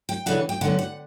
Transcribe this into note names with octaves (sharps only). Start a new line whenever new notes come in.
G5
C#3 E3 A3 D4 F#5
G5
D3 F#3 B3 F#5
F#5